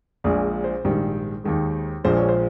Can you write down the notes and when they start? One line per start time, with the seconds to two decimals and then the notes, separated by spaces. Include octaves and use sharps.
0.24 A#1 A#2 G#3 G#4
0.64 C5
0.84 A#1 G#2 D#3 G3
1.44 D#2 D#3 G#3
2.04 A#1 A#2 F3 G#3 C5
2.17 C#5
2.29 C5